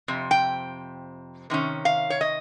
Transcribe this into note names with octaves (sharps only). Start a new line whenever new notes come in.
F2 C3
G5
C3 D#3 C#4
F5
C#5
D#5